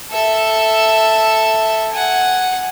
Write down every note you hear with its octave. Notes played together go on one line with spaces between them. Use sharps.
A4 E5
F#5 G#5